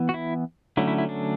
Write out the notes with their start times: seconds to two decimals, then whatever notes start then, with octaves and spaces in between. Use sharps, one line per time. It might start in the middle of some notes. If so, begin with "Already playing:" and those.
Already playing: E3 B3
0.09 F#4
0.14 E4
0.77 D3 F#3 A3 C#4 E4
0.88 E4
0.98 E4
1.09 D4